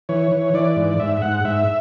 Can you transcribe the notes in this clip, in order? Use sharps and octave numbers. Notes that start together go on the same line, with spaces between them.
E3 C#5
E3
E3 D5
G#2
G#2 E5
E5
G#2 F#5
G#2 E5